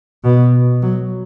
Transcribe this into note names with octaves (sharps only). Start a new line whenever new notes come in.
B2
F#3